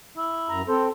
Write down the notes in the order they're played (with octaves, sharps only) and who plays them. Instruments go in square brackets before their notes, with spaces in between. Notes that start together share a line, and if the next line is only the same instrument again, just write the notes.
[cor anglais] E4
[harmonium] F#2 A#5
[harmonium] C4 A4 [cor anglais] C5